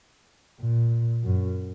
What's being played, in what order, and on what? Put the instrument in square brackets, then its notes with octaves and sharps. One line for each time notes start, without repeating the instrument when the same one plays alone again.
[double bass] A#2
F#2